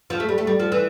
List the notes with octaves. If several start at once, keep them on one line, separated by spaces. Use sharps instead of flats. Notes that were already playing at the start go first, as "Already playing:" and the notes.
F3
A3
G3
A3
G3
F3
E3